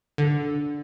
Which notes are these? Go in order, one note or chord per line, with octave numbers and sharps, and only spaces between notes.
D3